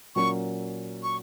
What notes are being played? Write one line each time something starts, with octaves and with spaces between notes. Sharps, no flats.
A#2 F#3 A#3 C#4 C#6
C#6